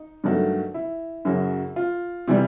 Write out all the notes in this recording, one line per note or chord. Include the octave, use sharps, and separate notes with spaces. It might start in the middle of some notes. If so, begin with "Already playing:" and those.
Already playing: D#4
G2 D#3 F#3 A3
E4
F#2 C#3 F#3
F4
C3 E3 G3